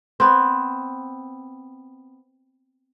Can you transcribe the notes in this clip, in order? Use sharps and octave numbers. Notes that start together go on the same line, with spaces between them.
B3 C4